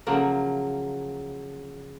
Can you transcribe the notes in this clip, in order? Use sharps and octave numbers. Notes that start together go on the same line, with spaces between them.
C#3 F3 F#3 A#3